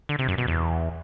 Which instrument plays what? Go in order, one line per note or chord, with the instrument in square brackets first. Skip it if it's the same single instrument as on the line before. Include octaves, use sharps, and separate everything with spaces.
[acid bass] D3
C3
F#2
B2
E2